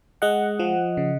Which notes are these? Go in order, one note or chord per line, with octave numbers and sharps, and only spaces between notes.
G#3 D#5 F#5
F3
C#3